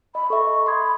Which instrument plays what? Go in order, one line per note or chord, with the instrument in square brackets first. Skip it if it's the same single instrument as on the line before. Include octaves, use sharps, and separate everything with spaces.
[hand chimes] D#5 [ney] B5
[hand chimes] A4 E5 [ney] C#6
[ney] B5 [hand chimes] C6 D#6 G#6